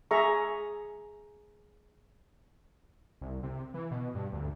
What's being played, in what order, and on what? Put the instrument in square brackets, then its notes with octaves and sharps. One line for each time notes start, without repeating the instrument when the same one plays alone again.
[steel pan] G#4 E5 A#5 C#6
[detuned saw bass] C2
C3
E3
B2
G2
D2